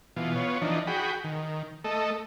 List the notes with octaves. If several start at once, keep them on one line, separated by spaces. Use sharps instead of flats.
B2 E3 F4
B3 F4 C#5
E3 F3 D4 D#4
F#4 G#4 G5 B5
D#3
A3 A4 D#5